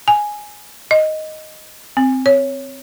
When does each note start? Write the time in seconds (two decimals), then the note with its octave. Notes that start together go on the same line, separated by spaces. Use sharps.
0.08 G#5
0.91 D#5
1.97 C4
2.26 C#5